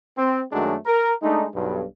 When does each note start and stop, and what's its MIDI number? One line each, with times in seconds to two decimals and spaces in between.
0.17 0.42 60
0.52 0.76 42
0.52 0.76 51
0.52 0.76 54
0.52 0.76 56
0.52 0.76 57
0.52 0.76 62
0.86 1.13 70
1.22 1.46 56
1.22 1.46 57
1.22 1.46 62
1.22 1.46 63
1.54 1.84 35
1.54 1.84 43